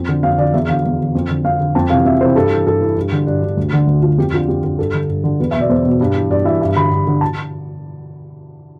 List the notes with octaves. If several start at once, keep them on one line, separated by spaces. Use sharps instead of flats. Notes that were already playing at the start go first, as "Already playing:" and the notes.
Already playing: F2
D3
F2 F5
D3 D5
E2 E5
D3 F5
E2
D3
F2
D3
F2 F5
D3
F2 A5
C3 E3 F5
F2 E5
C3 E3 C5
G2 A4
E3
G2 A4
E3
G2
D3
G2 D4
D3
D2
D3
D2
D3 F4
F2 G4
D3 F4
F2 G4
D3
G2 A4
D3
G2
D3
E2 B4
B2 E5
D5
E2 C5
B2
G2
E3
G2 D5
E3 E5
G2 E5
D3 B5
G2
D3
A5